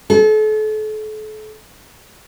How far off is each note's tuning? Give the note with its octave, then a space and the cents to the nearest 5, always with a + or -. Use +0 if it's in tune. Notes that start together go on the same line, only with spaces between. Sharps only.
A4 -35